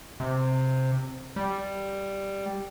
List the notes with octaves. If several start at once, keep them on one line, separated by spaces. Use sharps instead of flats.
C3
G3